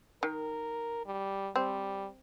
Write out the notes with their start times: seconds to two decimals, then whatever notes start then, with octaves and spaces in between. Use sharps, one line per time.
0.23 D#3 A#4
1.06 G3
1.56 G3 C4